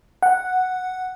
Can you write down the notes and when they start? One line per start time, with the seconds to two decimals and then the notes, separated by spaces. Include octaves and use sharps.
0.23 F#5